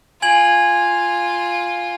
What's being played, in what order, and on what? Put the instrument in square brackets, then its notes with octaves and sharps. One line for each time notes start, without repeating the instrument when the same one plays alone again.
[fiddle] F4 [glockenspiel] G#5 G#6 F#7